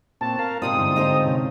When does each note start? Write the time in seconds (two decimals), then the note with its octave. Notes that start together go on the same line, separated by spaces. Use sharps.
0.21 A#2 C4 A5 C#6 F#6
0.39 A#4 F5
0.62 E2 G#2 C3 G3 C4 F4 D#6
0.77 G2 D3 F5
0.96 D#4 G4 A4 C5 E5 A#5
1.22 C3 C#4